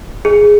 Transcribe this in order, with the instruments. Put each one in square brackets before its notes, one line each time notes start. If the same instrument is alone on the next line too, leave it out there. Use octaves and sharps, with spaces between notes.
[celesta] G#4